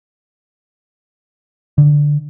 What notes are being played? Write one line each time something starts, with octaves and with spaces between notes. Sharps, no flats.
D3